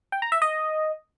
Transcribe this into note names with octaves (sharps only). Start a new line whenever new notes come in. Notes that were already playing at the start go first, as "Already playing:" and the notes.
G5
A#5
E5
D#5